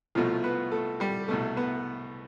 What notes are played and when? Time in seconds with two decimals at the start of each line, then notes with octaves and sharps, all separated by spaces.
0.15 C2 B2 F3 A3 F4
0.44 B3 B4
0.71 A3 A4
1.00 G3 G4
1.28 C2 B2 A3 A4
1.56 B3 B4